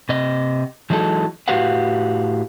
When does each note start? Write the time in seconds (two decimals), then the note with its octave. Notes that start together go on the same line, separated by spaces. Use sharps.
0.09 C3 D#5
0.90 E3 F#3 G#3 D#4 A4
1.48 A2 F#4 G4 B4 F5 F#5